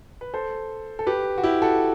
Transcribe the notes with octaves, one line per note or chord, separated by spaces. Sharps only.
B4
A4 C5
A4
G4 B4
F#4
E4 G4
F#4 A4